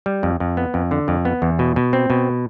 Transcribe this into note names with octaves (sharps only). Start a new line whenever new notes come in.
G3
F2
F2
B3
F2
D3
F2
B3
E2
B2
B2
C4
B2